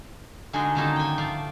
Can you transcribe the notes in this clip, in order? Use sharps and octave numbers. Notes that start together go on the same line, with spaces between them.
D3 G#3 D4 D#4 F#4 G#4
D3 D#3 A#3 C#4 D#4 A4
G5 G#5
F3 A3 F4 D5